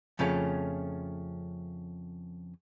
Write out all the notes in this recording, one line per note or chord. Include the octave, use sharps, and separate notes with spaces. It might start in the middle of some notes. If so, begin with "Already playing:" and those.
F2 C#3 F3 A3 C#4